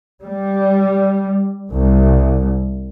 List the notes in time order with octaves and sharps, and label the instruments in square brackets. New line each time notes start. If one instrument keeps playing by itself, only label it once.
[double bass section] G3
C2